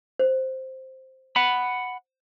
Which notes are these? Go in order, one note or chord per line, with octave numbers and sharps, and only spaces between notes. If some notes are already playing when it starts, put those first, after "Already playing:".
C5
F#5 B5